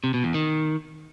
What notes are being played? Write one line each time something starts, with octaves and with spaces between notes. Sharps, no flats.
C3
B2
E2
D#3